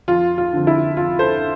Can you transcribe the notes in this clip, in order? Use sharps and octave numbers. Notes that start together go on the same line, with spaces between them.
F2 F4
F4
D3 F3 C4
E4
F2 F4
A4 C5